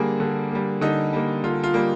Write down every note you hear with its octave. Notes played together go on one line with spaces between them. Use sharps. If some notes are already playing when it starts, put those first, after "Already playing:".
Already playing: D3 G3 A#3 G#4
D3
G3 A#3
D3 D#4
G3 A#3
D3 F4
F4
G3 A#3